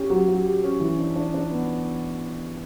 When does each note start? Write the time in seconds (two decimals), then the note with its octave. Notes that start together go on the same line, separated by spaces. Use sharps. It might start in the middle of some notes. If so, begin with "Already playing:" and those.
Already playing: C#4 G4
0.10 F#3
0.28 F#3
0.45 G4
0.63 C#4
0.80 E3
0.98 D4
1.16 D4
1.34 D4
1.51 B3